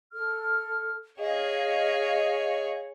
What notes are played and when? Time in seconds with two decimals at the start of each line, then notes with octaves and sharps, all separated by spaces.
0.13 A4 F6
1.20 G#4 C#5 D#5 F5